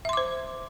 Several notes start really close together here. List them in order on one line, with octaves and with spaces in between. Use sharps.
E5 C6 D6 C5